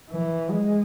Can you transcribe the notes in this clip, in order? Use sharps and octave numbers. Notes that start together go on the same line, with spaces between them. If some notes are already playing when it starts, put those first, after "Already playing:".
E3
G#3